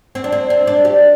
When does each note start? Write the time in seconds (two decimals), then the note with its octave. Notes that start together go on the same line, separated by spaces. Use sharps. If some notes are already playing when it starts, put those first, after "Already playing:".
0.15 C4
0.24 D4
0.32 C4
0.50 C4
0.67 D4
0.85 G4